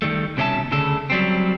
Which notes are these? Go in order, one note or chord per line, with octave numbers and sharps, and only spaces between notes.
D#3 G3 A3
C2 B2 C#4 F4 E5 A5
D2 C#3 A4
F#3 G3 C4